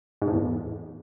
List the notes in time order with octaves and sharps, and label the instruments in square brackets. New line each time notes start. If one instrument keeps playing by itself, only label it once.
[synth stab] G#2
A2
E2